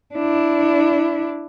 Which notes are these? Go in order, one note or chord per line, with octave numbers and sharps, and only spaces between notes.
D4 E4